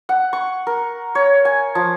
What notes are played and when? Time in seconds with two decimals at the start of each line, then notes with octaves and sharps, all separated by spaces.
0.09 F#5
0.33 C#6
0.67 A#4
1.15 C#5
1.45 G#5
1.75 F3